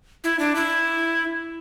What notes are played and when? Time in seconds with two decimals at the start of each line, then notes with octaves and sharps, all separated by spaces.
0.24 E4
0.39 D4
0.55 E4